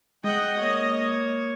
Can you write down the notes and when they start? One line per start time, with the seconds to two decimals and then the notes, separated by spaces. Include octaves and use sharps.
0.24 G#3 D#5 F#5 G5
0.56 A#3 C#5